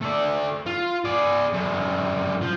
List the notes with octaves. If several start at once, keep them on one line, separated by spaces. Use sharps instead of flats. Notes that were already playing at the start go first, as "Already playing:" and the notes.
A3 D5
F4
G#4 D5
F#2 D3
F3